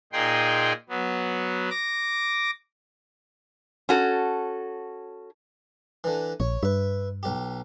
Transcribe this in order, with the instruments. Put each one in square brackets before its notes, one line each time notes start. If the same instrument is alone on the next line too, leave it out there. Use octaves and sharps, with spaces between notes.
[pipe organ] A#2 D#4 G#4 G5 C6
F#3 B3
D6 A#6
[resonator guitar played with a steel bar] C#4 F#4 A4
[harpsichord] D3 E3
[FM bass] A#1 [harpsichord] C#5
[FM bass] G2 [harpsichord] B4 E5
[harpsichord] B1 G4